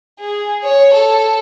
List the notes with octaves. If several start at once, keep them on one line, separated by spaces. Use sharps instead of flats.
G#4
C#5
A4